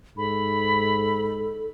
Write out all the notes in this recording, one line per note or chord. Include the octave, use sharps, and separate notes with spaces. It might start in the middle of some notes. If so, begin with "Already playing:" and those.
G#2 A4 B5